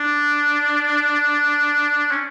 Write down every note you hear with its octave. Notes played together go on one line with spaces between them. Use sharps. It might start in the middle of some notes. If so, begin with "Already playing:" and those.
Already playing: D4
C#4